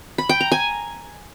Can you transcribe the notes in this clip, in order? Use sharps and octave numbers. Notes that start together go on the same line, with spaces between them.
B5
G5
A#5
G#5